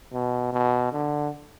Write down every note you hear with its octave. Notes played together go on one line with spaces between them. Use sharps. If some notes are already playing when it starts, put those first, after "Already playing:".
B2
B2
D3